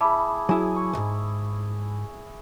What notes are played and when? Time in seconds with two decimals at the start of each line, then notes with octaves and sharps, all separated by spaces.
0.01 E4 G#4 A5 B5 D6
0.49 F#3 E4 G#4 G#5
0.76 C#6
0.93 C#2 G#2